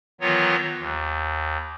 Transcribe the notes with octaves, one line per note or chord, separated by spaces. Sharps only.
D#3 E3 F#3 B3 F4 C#5
D#2